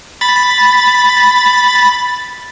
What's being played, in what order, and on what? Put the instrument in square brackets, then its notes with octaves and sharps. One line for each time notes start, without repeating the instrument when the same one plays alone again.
[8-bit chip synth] B5 A6